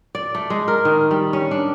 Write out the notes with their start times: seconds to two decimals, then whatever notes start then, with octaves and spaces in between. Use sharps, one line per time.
0.15 D5
0.35 A3
0.50 G#3
0.68 A#4
0.85 D#3
1.11 G3
1.33 C#4
1.51 D4